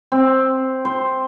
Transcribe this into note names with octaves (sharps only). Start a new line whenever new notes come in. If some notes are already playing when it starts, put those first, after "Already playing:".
C4
C5